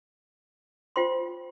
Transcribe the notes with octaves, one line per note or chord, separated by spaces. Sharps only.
F4 C5 G5 C6